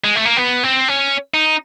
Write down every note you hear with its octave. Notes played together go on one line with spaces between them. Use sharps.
G#3
A3
A#3
B3
C4
C#4
D#4